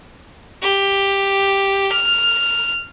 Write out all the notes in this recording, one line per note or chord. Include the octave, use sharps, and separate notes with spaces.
G4
F6